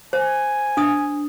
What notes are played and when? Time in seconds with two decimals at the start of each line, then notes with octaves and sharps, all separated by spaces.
0.13 C5 G#5
0.77 D4 D#6